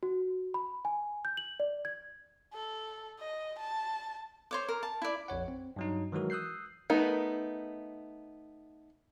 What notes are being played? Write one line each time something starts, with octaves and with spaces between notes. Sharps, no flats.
F#4
B5
G#5
G6
F#7
D5
G#6
A4
D#5
A5
C5 C#5 D6
A#4
A5
E4 D5
A#1 F2 C#5 F#5
C4
G2 F#3 D#4
D#3 E3 F#3 G#3 F#4 A#4
D#6 E6 F#6 G6 C7
A3 B3 D#4 A#4